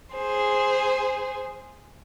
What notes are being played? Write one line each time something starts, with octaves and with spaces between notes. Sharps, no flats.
G#4 C5